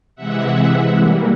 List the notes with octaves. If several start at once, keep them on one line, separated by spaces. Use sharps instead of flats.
C3 E3 G#3 E5 F#5
E3 G3 A#3